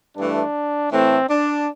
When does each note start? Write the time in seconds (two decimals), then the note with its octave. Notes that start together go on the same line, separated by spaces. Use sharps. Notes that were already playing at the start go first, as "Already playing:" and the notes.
0.17 G2 E3 A3 D4
0.92 A2 E3 A3 C4
1.29 D4